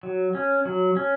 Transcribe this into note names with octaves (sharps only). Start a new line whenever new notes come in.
F#3
C#4
F#3
C#4